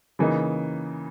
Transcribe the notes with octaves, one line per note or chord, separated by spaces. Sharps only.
C#3 E3 A#3 D#4